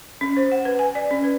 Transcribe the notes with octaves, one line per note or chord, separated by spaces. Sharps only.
C#4
C5
F#5
B4
G#5
D5
C#4
B4